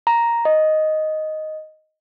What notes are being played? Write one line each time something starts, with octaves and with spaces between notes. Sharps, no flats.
A#5
D#5